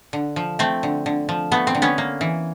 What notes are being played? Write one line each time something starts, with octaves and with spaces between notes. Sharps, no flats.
D3
F3
A3 C4
D3
D3
F3
A3 B3
C4
D3
B3 C#4
A#3
E3